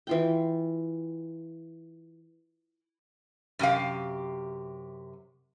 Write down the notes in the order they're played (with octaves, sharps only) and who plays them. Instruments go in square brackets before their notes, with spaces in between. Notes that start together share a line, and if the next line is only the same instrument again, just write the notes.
[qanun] E3 F4 G5
[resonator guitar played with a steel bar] F#2 C3 G4 F5